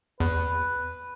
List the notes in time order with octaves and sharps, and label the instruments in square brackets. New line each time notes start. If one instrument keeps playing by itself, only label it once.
[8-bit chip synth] E2 [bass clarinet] B4